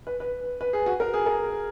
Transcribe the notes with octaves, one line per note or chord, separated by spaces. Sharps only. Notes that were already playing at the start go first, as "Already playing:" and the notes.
B4
B4
B4
G#4
F#4
A#4
G#4
A#4